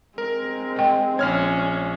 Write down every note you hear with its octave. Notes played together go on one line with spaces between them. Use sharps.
G#3 C4 A#4
D#5 G5
A#1 C#4 C#5 F6 G#6